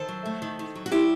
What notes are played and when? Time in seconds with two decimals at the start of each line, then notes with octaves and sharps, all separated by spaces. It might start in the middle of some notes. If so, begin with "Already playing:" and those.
Already playing: D#3 A4 C5
0.08 F#3
0.26 A3
0.42 D#3
0.59 D#3
0.76 F#3
0.86 F#4
0.92 G3 E4 G4